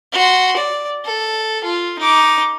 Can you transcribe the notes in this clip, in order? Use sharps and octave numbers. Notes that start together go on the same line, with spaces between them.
F#4 C6
D5
A4
F4
D#4 D6